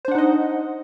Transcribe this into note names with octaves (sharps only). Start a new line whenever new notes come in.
D4 D#4 C5 D#5 F#5